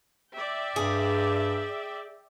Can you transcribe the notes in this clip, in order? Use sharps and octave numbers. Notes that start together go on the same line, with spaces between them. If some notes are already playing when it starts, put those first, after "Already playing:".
D5 E5 G5
G2 G#4